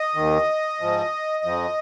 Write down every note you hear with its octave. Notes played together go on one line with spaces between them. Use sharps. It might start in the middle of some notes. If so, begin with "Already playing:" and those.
Already playing: D#5
D#2 D#3
G#2 F3
F2 F3